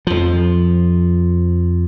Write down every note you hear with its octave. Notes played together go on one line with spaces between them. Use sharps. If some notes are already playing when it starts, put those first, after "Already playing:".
F2 F3